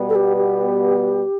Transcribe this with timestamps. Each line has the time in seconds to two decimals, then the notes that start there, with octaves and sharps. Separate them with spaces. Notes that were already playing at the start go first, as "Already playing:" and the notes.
Already playing: B2 G3 B3
0.09 A4
0.15 G4
0.37 G4